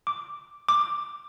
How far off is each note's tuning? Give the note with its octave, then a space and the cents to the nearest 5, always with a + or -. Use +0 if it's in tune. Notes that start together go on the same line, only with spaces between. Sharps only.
D6 -5
D6 +5